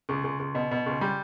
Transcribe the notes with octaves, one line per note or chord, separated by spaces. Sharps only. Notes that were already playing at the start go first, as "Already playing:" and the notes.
C#2
C#2
C#2
B2
B2
C#2
G3